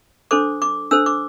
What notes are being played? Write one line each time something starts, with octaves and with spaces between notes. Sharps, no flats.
D4 A4 C5 D6
D6
D4 A4 C5 E6
D6